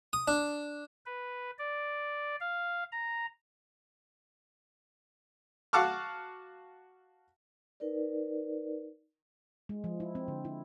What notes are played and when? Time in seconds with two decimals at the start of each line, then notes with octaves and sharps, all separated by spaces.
0.13 D#6
0.28 D4
1.06 B4
1.59 D5
2.41 F5
2.92 A#5
5.73 F#4 F5 F#5 A5 D6 F6
7.80 D#4 A#4 B4 D5
9.69 G#3
9.84 F3
10.00 E4
10.15 C4
10.28 D3
10.45 E4